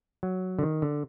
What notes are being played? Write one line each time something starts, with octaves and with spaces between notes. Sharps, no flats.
F#3
D3
D#3
D3